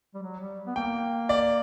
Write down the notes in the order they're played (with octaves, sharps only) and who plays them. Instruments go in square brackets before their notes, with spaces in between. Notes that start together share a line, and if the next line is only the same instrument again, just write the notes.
[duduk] G3
F#3
G3
B3
[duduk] A#3 [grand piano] G5
[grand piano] D5